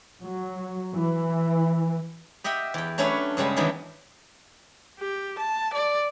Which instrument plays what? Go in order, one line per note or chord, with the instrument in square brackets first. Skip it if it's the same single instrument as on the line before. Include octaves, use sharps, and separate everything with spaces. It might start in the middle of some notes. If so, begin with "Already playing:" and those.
[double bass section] F#3
E3
[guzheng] G4 D#5 E5 F#5 G5
E2 G5
F#3 A3 C#4 D4 B4 C#5
G2 C#3 G3 G#3
D#3 E3 F#3 B3 D4
[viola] G4
A5
D5